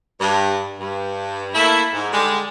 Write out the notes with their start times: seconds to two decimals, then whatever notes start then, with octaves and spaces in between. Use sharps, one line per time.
0.20 G2
0.79 G2
1.54 A3 A#3 E4
1.93 G#2
2.12 D3 G3 G#3